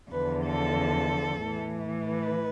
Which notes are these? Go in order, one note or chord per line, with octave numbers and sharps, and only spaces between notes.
E2 D3 F3 B4
A4
A2 E3
B4